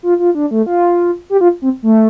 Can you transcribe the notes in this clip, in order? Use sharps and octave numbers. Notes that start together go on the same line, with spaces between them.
F4
F4
D4
A3
F4
G4
F4
C4
A3